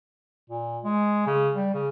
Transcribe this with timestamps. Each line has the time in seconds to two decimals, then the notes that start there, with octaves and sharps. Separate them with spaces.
0.50 A#2
0.84 G#3
1.27 C#3
1.54 G3
1.74 C#3